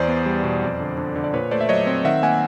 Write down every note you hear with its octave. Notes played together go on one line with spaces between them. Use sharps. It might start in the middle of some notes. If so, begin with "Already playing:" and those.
Already playing: E2 C5 D5
B3
G3
B2
F2
D3
D3
D3
D5
A#2 B4 C#5
A3 C5 D5
E5
F#3 C#5 D#5
C4
D#3 E5 F#5
A#3 F#5 G#5